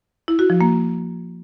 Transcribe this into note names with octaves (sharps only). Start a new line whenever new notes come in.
E4
F#4
F3
A#3